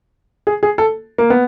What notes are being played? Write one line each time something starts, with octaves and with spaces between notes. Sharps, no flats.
G#4
G#4
A4
A#3
B3